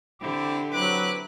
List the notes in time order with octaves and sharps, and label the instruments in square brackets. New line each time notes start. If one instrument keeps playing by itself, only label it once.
[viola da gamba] D3 G4 [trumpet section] C4 E4 D6
[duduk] F#3 [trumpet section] C4 E4 B4 [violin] D6 F#6